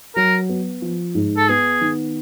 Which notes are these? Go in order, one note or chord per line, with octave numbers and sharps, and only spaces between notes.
F#3 A#4
B3
F3
G#2
A4
B3 G#4
D#3